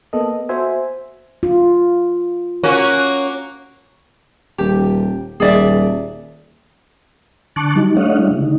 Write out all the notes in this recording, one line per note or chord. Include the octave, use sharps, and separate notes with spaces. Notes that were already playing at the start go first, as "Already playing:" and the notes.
A#3 B3 A4 D#5
F#4 C5 E5 G#5
F4
A#3 C#4 F#4
D#1 G4
D#1 G#4 D5 E5
D3 A5 C#6 D6 F#6
F#3 G3 D#4
A3 D4 C#5 D#5 F5 F#5
G3 G#3 D4 E4
C#3
D3 D#4